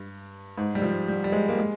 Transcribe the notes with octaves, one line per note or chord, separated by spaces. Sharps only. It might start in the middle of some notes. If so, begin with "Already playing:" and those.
Already playing: G2
G#2
G3
F3
G3
G3
G#3
A#3
G#3